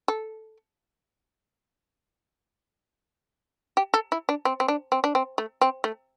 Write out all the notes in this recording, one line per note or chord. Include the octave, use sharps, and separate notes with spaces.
A4
G4
A4
E4
D4
C4
C4
D4
C4
D4
C4
A3
C4
A3